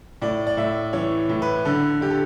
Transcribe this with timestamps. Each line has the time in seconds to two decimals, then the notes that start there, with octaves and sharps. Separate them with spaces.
0.22 A2 D5
0.47 D5
0.57 A2 E5
0.93 E3 C#5
1.29 A2
1.42 B4
1.65 D3 A4
2.01 D3 G4
2.10 A4